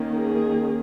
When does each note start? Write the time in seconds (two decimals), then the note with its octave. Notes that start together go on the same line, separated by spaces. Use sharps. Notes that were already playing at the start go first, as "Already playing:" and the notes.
Already playing: D#3 A#3 C#4
0.16 G#4